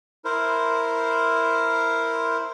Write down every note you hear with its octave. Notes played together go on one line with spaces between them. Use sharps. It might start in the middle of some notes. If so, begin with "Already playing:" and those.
E4 A#4 C5